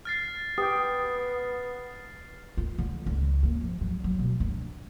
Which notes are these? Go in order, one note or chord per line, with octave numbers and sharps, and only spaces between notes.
F6 A6 C7
B3 G4 G5 D#6
F4
D3
C#2
A#3
F3
F#3
F#3
B2
D4